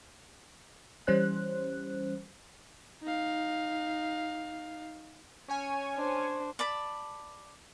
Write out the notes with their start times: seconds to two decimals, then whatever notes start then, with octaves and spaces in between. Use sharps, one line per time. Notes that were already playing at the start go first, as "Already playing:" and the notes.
1.07 E3 G3 C#4 C5 F#6
3.03 D#4 F5
5.48 C#4 C#5 G#5
5.95 D4 C5
6.59 D5 A5 B5